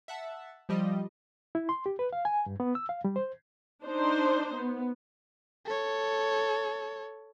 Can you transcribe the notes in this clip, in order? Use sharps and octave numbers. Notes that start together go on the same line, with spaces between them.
E5 F#5 A5
F3 G3 D#5
E4
C6
G4
B4
F5
G#5
G2
B3
E6
F5
G3
C5
D4 D#4 C5
B3
A4 C#5